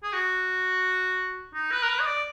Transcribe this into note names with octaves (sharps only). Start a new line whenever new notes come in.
G#4
F#4
D#4
B4
A#4
B4
D#5
D5